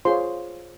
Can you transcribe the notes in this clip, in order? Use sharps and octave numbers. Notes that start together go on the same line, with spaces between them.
F4 G#4 C5 C#5 C6